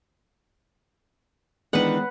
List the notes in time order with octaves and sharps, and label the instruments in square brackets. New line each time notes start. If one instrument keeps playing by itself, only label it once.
[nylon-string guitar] D#3 E3 D4 [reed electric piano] G#3 B3 [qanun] B4 F#5